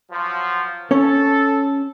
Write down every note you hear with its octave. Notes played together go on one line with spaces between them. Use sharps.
F3 F#3
C#4 A4 C#5